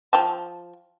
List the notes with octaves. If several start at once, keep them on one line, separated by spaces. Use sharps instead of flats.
F3 G5 A5